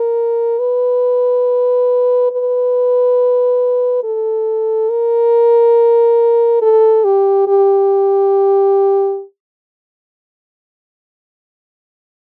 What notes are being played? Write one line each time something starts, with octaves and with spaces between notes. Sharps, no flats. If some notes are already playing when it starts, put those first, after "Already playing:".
Already playing: A#4
B4
B4
A4
A#4
A4
G4
G4